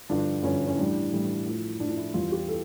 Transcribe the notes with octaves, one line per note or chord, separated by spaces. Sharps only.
G2 D3 F3 D4
G2 D3 F3 C#4
C#4
A2 E3 G3 D4
A2 E3 G3
A2 F3
A2 F3 D4
D4
E4
E2 E3 G3 F4
G4
A4